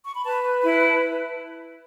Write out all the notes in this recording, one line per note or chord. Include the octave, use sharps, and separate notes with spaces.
C#6
B5
B4 A5
E4 B5
B5
A5